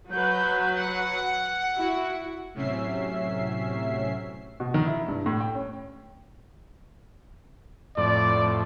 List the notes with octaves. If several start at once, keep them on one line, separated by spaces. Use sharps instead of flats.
F#3 F#4 B4 G6
F#5
E4 F#4
A2 C3 F#3 C#4 E5 C7
B2
D#3
E4
G2
A2
G5
C#4
F2 A2 D5